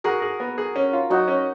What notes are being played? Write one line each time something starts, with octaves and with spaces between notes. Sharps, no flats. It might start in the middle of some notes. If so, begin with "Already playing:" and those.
F#4 G#4 A#4
G#4
B3
G#4
C#4
F4
F#3 D#4 F#4
C#4